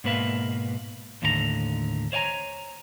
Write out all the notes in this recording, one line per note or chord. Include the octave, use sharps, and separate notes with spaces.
G#2 B2 A#3 B4 E5 F5
D#2 A2 D3 E4 A#5
C5 C#5 D#5 G#5 A#5